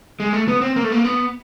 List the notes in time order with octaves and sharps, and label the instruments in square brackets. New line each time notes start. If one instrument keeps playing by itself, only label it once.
[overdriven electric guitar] G#3
A3
B3
C4
A#3
A3
A#3
B3